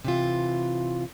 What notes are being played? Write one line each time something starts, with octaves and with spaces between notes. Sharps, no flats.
C3 E3 F4